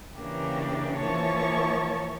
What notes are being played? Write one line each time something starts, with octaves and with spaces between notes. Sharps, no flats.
C#3 E3 A#3 D4 G4
E3 F3 A#3 C#5 A5 C#6